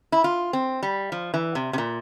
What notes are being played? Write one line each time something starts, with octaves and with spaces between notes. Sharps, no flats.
E4
F4
C4
G3
F3
E3
C3
C3
A#2